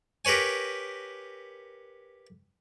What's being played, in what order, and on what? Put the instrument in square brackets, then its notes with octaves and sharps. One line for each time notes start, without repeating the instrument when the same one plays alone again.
[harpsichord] G4 A#4 B4 C#5 G#5